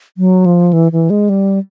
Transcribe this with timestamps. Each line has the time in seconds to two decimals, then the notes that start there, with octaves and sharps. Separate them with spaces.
0.17 F#3
0.46 F3
0.73 E3
0.92 E3
1.10 G#3
1.29 G3